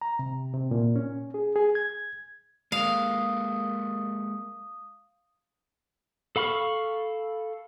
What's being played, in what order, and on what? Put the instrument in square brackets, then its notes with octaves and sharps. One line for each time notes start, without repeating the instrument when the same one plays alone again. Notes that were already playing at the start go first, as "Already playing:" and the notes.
[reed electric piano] A#5
C3
C3
A#2
C#4
G#4
G#4
G#6
[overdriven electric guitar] G#3 A#3 [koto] F5 [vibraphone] D#6
[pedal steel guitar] A4 F5 B5 C#6 F6